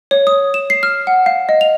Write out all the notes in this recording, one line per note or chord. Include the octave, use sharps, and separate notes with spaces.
C#5
D#6
E7
C7
F6
F#5
F5
D#5
F7